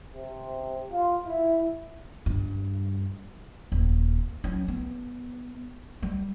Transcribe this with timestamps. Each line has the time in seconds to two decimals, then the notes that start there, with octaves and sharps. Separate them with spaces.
0.14 C3
0.91 F4
1.26 E4
2.26 G2
3.72 D#1
4.44 F#3 C#4
4.68 B3
6.02 G3